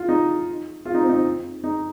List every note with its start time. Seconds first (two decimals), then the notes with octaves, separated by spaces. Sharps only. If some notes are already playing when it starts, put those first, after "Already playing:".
Already playing: F4
0.09 D#4
0.85 F4
0.94 D#4
1.02 C4
1.09 D#4
1.64 D#4